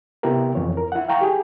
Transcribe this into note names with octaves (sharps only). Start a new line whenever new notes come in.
C3 B3 E4 G4 A#4
F2 E3 C#5
A#4
E4 F#5
F5 G5 A#5 C#6
G4 G#4